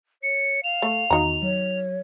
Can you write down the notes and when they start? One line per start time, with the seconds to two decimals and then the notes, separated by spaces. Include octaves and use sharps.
0.23 C#5 C#7
0.63 F5 E7 F7
0.82 A3
1.10 E2 D#3 D#4 F#4 A#5
1.42 F#3 C#5